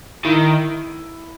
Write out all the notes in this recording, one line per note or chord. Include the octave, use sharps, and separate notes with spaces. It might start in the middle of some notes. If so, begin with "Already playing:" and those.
D#3 E4